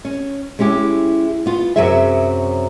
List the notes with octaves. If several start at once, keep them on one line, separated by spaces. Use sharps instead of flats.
C#4
G#3 C#4 E4 G4
B3 F4
F#2 C3 F#3 G#4 E5